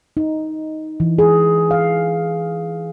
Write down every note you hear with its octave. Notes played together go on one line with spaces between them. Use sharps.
D#4
E3
G#4
F5